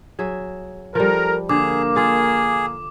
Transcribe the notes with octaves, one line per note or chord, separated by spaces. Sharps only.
F#3 G#4 E5
F3 G3 A4 A#4
D3 A#3 G#4 D6
F4 G#4 A4 F5